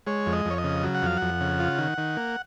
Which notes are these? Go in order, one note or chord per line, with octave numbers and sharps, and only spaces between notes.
G#3 C#5
F2
D#5
F2 C#5
D#5
C#3
F#3
F#5
F2 F5
F2 F#5
C#3
F4
D#3
D#3
A#3